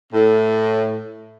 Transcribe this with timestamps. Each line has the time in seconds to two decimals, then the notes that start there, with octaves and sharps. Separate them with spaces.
0.13 A2